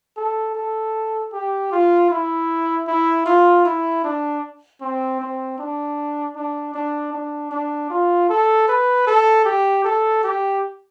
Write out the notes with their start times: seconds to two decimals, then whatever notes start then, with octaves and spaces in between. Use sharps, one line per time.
0.17 A4
0.55 A4
1.33 G4
1.72 F4
2.10 E4
2.87 E4
3.26 F4
3.65 E4
4.04 D4
4.81 C4
5.20 C4
5.58 D4
6.36 D4
6.74 D4
7.13 D4
7.51 D4
7.90 F4
8.29 A4
8.68 B4
9.07 A4
9.45 G4
9.84 A4
10.23 G4